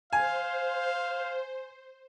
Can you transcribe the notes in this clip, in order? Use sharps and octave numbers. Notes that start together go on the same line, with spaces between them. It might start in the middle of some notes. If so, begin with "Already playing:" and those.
C5 F5 G#5